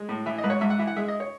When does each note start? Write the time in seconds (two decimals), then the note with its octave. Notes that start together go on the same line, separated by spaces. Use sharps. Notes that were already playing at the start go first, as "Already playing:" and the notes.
Already playing: G#3
0.09 A2
0.26 E3 E5
0.38 D#5
0.44 G#2 B4
0.50 C#5
0.61 G#2 E5
0.70 F#5
0.79 E3 E5
0.87 F#5
0.96 G#3 E5
1.08 D#5
1.20 C#5